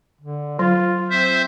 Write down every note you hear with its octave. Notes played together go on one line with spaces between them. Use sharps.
D3
F#3 F4
C4 C5 E5